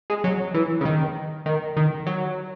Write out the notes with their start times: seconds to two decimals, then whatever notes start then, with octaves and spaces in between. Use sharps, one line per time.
0.10 G#3
0.24 F#3
0.54 E3
0.81 C#3
0.85 D#3
1.46 D#3
1.77 D#3
2.07 F#3